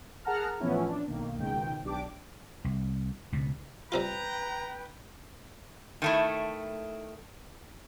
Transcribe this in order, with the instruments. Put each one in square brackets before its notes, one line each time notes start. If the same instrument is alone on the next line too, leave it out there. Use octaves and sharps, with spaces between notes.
[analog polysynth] G#4 A#4 F#5 A5 A#5 F6
A2 E3 F3 B3 C#4 E4
D4
B1 D#3 A#3
C#2 G#2 B2 D#3 G5
B1 D4 G4 D6
[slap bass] C2
C#2 B2
[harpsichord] G3 C4 F4 [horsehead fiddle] B4 G5 [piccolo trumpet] A#5
[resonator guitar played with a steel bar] D#3 A3 E4